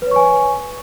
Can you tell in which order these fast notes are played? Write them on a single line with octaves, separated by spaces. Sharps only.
B4 C#5 C#6 G#5